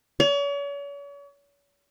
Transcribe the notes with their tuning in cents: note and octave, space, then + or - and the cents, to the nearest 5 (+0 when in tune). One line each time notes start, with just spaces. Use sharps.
C#5 +40